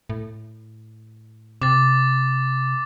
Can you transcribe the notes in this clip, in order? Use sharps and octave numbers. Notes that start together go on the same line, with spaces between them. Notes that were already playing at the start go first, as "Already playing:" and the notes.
A2
C3 D6 A6